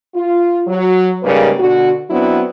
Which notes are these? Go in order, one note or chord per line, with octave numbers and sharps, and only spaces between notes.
F4
F#3
G#2 C#3 G3 A#3 B4
B2 D3 F#4
F#3 B3 C4 D4 E4